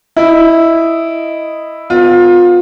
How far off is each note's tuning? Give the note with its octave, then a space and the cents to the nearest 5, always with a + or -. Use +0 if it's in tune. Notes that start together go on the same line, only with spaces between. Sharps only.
E4 +0 D#5 +0
B3 +30 F4 +25